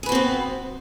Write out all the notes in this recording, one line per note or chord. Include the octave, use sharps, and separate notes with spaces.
B3 C4 F#4 G#4 B4